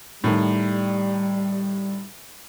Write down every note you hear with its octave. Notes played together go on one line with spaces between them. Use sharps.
A2 D#3 G3